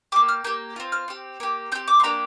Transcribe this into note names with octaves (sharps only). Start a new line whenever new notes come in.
A#3 G4 D6
F6
A#3 G4 G6
C4 F4
F6
C4 G4
A#3 G4
C4 G4 G6
D6
C6
A#3 D4 G4 A#5